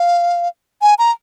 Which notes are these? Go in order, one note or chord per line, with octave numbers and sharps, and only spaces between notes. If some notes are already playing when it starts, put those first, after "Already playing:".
Already playing: F5
G#5
A#5